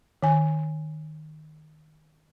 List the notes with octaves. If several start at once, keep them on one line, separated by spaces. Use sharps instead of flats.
D#3 G#5